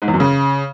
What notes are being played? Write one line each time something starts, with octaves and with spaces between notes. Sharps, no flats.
G#2
E2
F#2
C#3